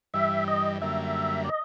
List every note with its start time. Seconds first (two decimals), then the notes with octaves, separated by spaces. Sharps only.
0.14 G2 E3 G3 E5
0.48 D#5
0.82 F#2 D3 G3 A#3 E5
1.45 D5
1.49 D#5